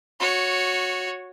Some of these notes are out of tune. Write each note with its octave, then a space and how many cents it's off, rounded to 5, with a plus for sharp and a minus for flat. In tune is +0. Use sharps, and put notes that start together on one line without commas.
F#4 -15 C#5 +0